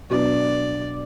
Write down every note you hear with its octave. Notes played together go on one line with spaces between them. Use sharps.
B2 F#3 B3 D4 D5